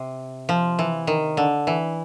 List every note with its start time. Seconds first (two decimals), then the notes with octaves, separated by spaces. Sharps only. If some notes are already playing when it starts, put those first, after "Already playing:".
Already playing: C3
0.49 F3
0.79 E3
1.07 D#3
1.37 D3
1.67 E3